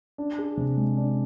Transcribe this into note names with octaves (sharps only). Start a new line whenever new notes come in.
D4
G#4
C3
G#3
D4